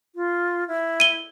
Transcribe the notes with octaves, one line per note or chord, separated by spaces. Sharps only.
F4
E4
D#7 G7